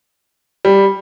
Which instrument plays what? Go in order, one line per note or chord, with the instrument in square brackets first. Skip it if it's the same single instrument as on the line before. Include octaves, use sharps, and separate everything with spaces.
[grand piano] G3